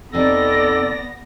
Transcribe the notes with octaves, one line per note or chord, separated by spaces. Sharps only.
F2 C3 B3 D#4 A4 D5 A#6